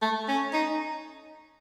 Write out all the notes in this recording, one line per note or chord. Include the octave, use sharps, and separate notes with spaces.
A3
C#4
D#4